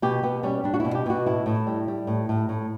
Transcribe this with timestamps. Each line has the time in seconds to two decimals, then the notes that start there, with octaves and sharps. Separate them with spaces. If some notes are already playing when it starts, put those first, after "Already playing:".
0.02 B2 G4
0.23 B2 B3
0.43 G3 C#4
0.64 G3 D4
0.74 F#4
0.80 B2 E4
0.95 G4
1.06 B2 F#4
1.26 A2 E4
1.46 A2
1.67 G3
1.88 G3
2.07 A2
2.29 A2
2.49 A2